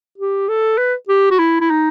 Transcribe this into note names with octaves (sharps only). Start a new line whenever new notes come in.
G4
A4
B4
G4
F#4
E4
E4
D#4